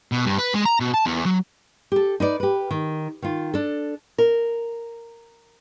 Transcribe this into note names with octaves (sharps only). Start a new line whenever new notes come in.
B2
G2
B4
G#3
A#5
B2
A5
E2
F#3
G4 A4
D#4 B4 D5
G4 B4
D#3
D#3 F4
D4 A4
A#4